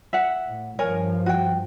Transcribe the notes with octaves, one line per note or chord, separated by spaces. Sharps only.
E5 F#5
A2
G2 F3 A#4 C#5 G#5
F#4 G5